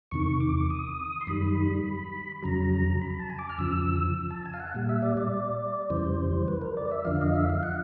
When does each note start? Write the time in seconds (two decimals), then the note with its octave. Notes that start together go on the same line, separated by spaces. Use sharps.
0.11 E2 C3 D#3 C#6
0.40 D6
0.70 D#6
1.21 C6
1.27 F#2 D#3 G3 B5
2.42 F2 C#3 F#3 A#5
3.01 B5
3.20 A5
3.30 G#5
3.39 D6
3.49 F6
3.59 F2 C#3 F3 E6
4.30 A5
4.46 G#5
4.54 F5
4.60 F#5
4.75 A#2 G3
4.89 E5
5.02 D5
5.17 D5
5.90 F2 C#3 E3 G3 C5
6.48 B4
6.62 A#4
6.77 D5
6.91 E5
7.05 F2 D3 F3 F5
7.21 D#5
7.36 E5
7.50 F5
7.63 F#5